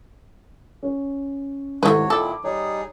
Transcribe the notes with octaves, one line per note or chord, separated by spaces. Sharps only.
C#4
G#1 C3 A3 E4 F#4 B4 C#5
A#2 D#3 E4 A4 D6
G3 D#4 G#4 C#5